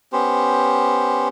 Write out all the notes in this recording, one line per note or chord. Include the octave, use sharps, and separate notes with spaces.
B3 C#4 G4 C5